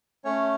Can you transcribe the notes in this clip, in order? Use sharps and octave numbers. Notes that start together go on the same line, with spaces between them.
A3 C#4 C#5